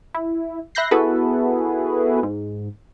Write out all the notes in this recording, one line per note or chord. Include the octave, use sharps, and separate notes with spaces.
E4
E5 B5 F#6 G6 A#6 C7
B3 E4 F#4 G#4 A4 B4
G#2